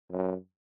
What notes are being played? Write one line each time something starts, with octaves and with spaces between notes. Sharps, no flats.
F#2